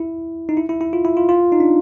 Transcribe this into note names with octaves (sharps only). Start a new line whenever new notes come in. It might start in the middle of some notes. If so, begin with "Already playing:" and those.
Already playing: E4
D#4
E4
E4
E4
F4
E4
F4
F4
D#4
D4